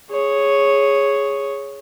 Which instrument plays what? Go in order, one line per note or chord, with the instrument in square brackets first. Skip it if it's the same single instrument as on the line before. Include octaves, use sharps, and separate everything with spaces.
[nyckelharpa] G#4 C#5